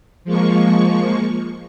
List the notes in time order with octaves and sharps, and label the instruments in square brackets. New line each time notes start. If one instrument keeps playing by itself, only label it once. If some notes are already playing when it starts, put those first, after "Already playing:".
[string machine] F3 G#3 A#3 C#6